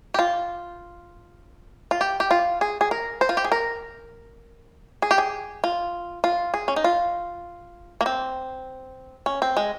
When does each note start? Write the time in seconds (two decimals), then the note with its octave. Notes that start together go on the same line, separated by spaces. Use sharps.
0.14 G4
0.19 F4
1.91 F4
2.01 G4
2.20 G4
2.31 F4
2.61 G#4
2.81 G#4
2.91 A#4
3.21 C5
3.29 F4
3.37 G4
3.44 G#4
3.52 A#4
5.02 G#4
5.11 G4
5.18 G#4
5.64 F4
6.24 F4
6.54 G#4
6.68 C#4
6.76 D#4
6.84 F4
8.01 A#3
8.06 C4
9.26 C#4
9.42 C4
9.57 G#3